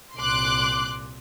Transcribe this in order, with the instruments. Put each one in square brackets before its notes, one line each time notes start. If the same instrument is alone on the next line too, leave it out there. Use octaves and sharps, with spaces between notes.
[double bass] C2 A#2 [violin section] C6 D6 F#6